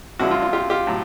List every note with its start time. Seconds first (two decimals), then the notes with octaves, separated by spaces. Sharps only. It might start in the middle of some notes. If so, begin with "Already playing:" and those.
0.19 F#2 D3 F3 G#3 E4 F#4
0.31 F4
0.42 F4
0.53 F4 G4
0.70 F4 G4
0.87 A2 F#3